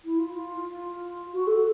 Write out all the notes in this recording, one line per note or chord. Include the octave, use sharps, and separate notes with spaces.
E4
F4
F4
F#4
A4